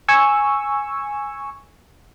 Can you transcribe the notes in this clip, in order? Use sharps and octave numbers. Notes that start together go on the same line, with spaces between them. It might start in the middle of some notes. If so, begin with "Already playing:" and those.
G#5 C#6 E6